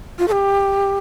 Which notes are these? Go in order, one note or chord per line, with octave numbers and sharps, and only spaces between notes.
F4
A4
G4